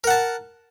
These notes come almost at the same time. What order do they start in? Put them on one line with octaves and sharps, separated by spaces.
A#4 F#5 A5